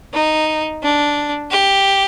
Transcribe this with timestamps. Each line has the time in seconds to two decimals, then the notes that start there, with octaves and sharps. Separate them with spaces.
0.14 D#4
0.82 D4
1.51 G4